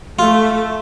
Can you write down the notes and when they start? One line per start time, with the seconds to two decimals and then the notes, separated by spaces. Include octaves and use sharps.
0.19 A3 F4